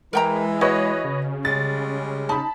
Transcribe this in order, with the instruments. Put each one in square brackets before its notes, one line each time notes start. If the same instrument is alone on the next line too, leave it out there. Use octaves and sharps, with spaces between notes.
[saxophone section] E3 [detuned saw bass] G#3 [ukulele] A#4 G5 A#5
[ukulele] F#4 [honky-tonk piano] B4 C#5 D#5
[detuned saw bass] C#3
[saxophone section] G3 G#3 C#4 [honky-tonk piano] A6
[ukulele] D#4 [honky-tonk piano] A5 B5